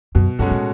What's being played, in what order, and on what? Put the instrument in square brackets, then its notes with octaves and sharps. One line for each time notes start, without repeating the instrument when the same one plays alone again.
[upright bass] F#2 [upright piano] B2
[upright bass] F#2 [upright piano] G#3 C#4 F#4 A4
[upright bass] A2